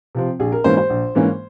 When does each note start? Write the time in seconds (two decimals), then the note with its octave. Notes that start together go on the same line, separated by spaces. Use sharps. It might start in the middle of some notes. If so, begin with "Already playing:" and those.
0.15 C3 F3 C4
0.40 A#1 G#4
0.52 A#4
0.64 G#2 E3 A#3 C#4 C5
0.77 C5
0.90 A#1
1.15 G#2 E3 A#3 C#4